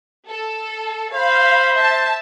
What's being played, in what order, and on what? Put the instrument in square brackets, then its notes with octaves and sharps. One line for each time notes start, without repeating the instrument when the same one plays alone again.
[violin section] A4
[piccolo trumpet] C5 [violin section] F5 B5
[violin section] E5 A5